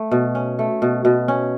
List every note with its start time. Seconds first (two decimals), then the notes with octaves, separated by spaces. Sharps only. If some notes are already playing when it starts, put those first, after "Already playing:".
Already playing: A3
0.11 B2
0.35 C#4
0.59 A3
0.82 B2
1.05 B2
1.28 C#4